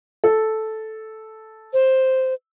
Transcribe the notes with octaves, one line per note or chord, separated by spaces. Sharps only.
A4
C5